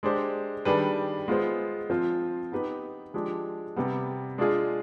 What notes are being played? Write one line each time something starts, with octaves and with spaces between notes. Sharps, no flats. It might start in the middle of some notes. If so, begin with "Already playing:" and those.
G#3 D4 G4 C5
D#3 G3 D4 G#4 B4
G#3 B3 F4 G#4 C5
F3 C4 F4 C5
B3 D#4 G4 B4
F3 G#3 D4 G4
C3 G3 B3
G#3 D4 F4 G#4